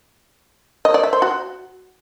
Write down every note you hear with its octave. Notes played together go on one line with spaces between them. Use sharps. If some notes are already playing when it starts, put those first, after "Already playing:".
D#5
D5
E5
C5
F#4